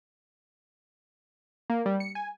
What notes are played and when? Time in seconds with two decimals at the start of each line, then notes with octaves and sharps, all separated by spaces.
1.70 A#3
1.86 G3
2.00 C#7
2.15 G#5